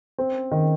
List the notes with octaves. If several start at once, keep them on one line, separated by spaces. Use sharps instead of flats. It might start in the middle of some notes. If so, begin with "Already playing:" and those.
C4
D#3